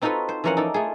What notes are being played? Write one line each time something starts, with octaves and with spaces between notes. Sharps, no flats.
C4 D#4 F4 F#4 A4 B4
C5
E3 F3 C#4 A#4 F5 F#5
D#4 A4 D5
A3 F4 G#4